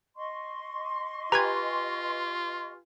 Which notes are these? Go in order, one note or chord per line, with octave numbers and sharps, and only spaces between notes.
D#5 C6 C#6
F4 G4 B4 G#5 A#5 G#6